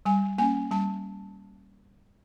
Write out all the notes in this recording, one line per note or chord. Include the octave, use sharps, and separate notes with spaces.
G3 G#5
A#3 C#4 G#5
G3 A5